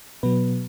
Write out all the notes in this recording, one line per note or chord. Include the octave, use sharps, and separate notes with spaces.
B2 F#3 B3 B4